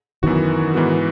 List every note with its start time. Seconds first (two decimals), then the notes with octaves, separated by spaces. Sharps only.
0.23 F#2 D#3 E3 B3 F#4
0.74 G#2 E3 B3 F#4